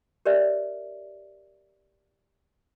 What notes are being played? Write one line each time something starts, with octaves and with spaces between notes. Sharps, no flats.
G4 A#4 B4 C#5 D5 E5